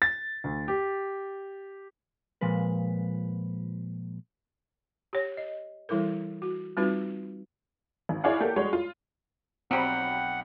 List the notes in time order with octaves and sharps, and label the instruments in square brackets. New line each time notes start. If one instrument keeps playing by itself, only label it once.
[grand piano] A6
D2
G4
[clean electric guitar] A#2 F3 G#3 B4
[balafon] G4 C#5
D#5
E3 G3 E4 A4 A#4
F#4
G3 C4 D#4 F4 F#4 B4
[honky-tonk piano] G#1
E4 G#4 C#5 D5 F5 F#5
A#3 G4 A4 A#4
G3 G#3 F#4 C#5
F4
[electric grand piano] B1 G5 B5 [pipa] F#3 G3 [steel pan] C4 [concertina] F#5